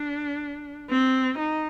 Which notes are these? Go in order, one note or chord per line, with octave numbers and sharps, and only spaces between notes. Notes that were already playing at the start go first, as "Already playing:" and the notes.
Already playing: D4
C4
D#4